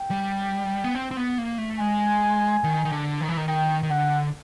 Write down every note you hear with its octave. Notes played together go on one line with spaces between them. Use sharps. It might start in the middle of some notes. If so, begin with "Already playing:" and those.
Already playing: G5
G3
B3
C4
C4
B3
A#3
A3
G#3 G#5
D#3
D#3
D3
D#3
E3
D#3
D#3 G5
D#3
D3 F#5